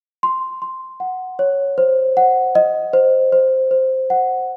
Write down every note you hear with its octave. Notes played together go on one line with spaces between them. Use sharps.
C6
C6
F#5
C#5
C5
F#5
D#5
C5
C5
C5
F#5